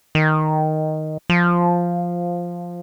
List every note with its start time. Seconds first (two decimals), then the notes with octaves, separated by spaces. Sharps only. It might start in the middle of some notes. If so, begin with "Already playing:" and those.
0.15 D#3
1.30 F3